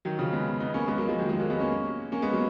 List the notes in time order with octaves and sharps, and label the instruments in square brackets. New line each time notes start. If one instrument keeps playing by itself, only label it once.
[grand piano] D#3 F#3
C#3 F3
G#3 B3
B3 D#4
A#3 C#4
G#3 B3
F#3 A#3
F3 G#3
D#3 F#3
F3 G#3
F#3 A#3
G#3 B3
A#3 C#4
A#3 C#4
G#3 B3
F#3 A#3